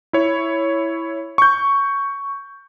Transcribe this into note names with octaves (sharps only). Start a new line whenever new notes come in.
E4 C#5
C#6 G6